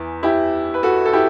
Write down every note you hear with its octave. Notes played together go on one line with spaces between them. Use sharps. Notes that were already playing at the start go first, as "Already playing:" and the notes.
Already playing: E2 E3
E4 G4
B4
F#4 A4
A4
E4 G4